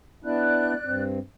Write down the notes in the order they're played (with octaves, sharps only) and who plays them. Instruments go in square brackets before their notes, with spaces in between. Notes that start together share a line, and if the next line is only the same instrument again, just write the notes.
[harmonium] B3 D4 E4 [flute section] D5 F#6
[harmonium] G2 C4